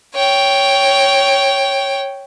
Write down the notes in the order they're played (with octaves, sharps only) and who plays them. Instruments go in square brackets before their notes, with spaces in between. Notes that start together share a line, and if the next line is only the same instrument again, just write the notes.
[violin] C#5 G5